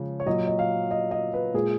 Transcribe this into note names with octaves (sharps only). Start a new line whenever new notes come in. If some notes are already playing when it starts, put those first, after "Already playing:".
Already playing: C#3 F3 G#3
C#5
A#2 F#3 D#5
D#5
F5
D#5
D#5
B4
A#2 G#3 G#4